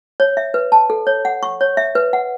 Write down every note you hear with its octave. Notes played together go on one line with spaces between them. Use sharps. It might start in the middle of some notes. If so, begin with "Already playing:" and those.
C#5
E5
B4
A5
A4
C#5
F#5
C#6
C#5
E5
B4
F#5